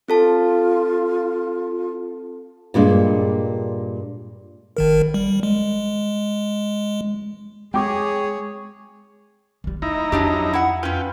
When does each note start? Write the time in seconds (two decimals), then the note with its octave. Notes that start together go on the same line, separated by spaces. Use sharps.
0.09 C4 F4 A4 A5
2.74 G2 A#2 G#3 D4
4.77 G#1 D#3 A#4
5.14 G3
5.43 G#3
7.74 G#3 G#4 C#5 G5 D6
9.64 D#3 G3
9.82 A3 D#4 E4 A#5
10.12 F2 F#3 D4 G4
10.54 E4 F#5
10.83 C#4 F4 B4 G5